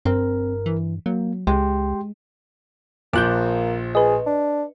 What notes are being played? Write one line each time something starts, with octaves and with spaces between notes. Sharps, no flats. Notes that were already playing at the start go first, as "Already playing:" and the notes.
G1 G2 C4 A#4
E3
F#3 A#3
C#2 G#3 G4 G5 C6
A#1 F3 A#3 D6 F#6 G6
G#4 B4 D#5
D4